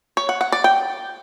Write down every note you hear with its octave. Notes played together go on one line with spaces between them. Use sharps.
C#5
F#5
F#5
D5
G5